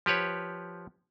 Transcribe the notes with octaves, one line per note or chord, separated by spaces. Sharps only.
F3 G4 B4 C#5